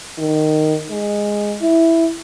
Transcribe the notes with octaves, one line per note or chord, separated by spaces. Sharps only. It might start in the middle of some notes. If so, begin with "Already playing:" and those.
D#3
G#3
E4